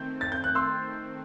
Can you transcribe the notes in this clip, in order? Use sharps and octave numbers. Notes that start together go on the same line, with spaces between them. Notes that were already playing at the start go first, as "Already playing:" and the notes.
Already playing: D#3 A3 C4 G6
A6
G6
F#6
C6 E6